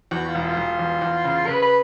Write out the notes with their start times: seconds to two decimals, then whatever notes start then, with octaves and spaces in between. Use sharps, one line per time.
0.11 E2 F#4
0.27 F4
0.35 E1
0.42 F4
0.57 E1
0.79 E2
1.02 E2
1.24 C#3
1.47 C#3 B4
1.63 B4